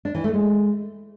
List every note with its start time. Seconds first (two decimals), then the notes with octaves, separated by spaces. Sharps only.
0.05 D4
0.15 E3
0.24 A3
0.34 G#3